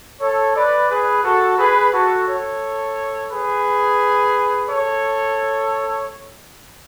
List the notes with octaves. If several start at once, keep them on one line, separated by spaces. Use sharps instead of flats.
A4 C#5
B4 D5
G#4 B4
F#4 A4
G#4 B4
F#4 A4
A4 C#5
G#4 B4
A4 C#5